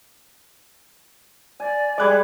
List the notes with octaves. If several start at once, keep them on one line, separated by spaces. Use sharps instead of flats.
D5 G#5
G3 G#3 D5 D6 F#6 G#6